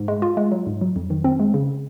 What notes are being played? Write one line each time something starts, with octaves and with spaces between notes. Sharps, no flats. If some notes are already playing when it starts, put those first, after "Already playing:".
Already playing: G#2
G#3
F4
G#3
F#3
G#2
F#3
F2
D#3
C4
G#3
C#3